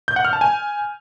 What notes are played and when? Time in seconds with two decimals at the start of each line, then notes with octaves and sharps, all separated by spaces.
0.08 G6
0.16 F#5
0.25 F6
0.33 A5
0.41 G#5